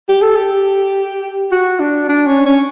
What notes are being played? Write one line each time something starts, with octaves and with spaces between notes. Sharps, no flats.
G4
A4
G4
F#4
D4
D4
C#4
C#4